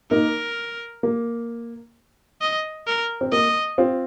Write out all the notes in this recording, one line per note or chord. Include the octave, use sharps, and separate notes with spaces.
A#3 D#4 A#4
A#3
D#5
A#4
C4
A#3 D#5
C4 F4